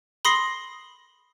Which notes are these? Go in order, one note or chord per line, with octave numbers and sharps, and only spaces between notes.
B5 C6 D#6 A#6 C7